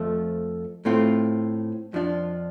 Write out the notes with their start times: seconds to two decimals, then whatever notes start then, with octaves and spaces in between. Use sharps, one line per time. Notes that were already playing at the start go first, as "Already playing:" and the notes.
Already playing: F2 F3 A3
0.85 A2 A3 C4 F4
1.93 F2 F3 D4 F4